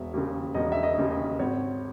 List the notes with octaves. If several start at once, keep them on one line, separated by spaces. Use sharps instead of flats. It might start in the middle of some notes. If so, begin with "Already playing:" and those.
Already playing: E1 E5
D#2 C#3
E1 D#5
E5
D#5
D#2 C#3
D#5
G#1 C#5